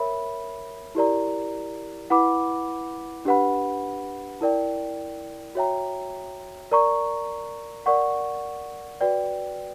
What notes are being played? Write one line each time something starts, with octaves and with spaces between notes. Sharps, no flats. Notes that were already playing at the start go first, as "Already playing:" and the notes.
Already playing: A#4 C#5 E5 B5
E4 G4 A#4 D5 A#5
E4 B4 F#5 B5 D6
D4 G4 B4 F#5 B5
E4 A#4 D5 G5
F#4 C#5 E5 G5 A#5
A#4 D5 A#5 C#6
A#4 D5 F#5 C#6
F#4 B4 D5 G5